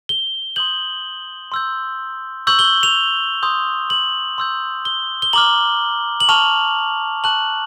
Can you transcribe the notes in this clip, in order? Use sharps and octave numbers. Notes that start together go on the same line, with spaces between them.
G7
C6 D#6 G6 F#7
C6 E6 G6
C#6 E6 G6 F#7
G7
F7
C6 D#6 G6
F#7
C6 E6 G6
G7
G7
A#5 D6 F6 F#7
F#7
A5 C#6 F6 F7
A5 C#6 F#6 F#7